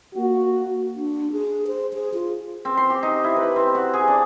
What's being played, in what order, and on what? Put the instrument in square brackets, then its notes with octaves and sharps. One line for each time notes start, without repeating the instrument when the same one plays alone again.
[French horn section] A#3 F#4
[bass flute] D4
G#4
C5
G#4
F4
[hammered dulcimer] C4
C6
G4
D#4
E4
B4
C4
F#4
G#4
D4